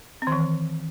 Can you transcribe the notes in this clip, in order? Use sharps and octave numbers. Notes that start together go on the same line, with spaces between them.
C4
D#3
E3